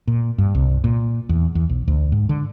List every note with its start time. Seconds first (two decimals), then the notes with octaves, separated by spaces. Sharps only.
0.08 A#2
0.38 G2
0.55 C2
0.84 A#2
1.29 E2
1.55 E2
1.69 B1
1.88 D2
2.12 G#2
2.29 D3